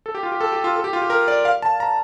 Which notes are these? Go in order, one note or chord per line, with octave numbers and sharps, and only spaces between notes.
A4
G4
F4
G4
A4
G4
F4
A4
G4
F4
G4
A#4
D5
F5
A5
A#5